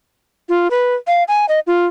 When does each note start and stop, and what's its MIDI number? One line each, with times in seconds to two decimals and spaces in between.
0.49 0.68 65
0.71 0.95 71
1.07 1.24 77
1.28 1.46 80
1.49 1.60 75
1.67 1.86 65